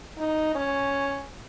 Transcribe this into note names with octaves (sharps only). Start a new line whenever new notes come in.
D#4
C#4